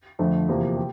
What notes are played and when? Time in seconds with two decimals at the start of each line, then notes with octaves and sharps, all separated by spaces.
0.19 F2 D3 F3 A3
0.48 E2 C3 F3 A#3
0.77 G4